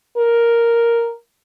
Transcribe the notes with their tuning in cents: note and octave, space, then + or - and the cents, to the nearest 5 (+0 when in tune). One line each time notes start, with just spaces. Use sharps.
A#4 +0